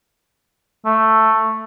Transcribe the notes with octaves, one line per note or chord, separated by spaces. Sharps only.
A3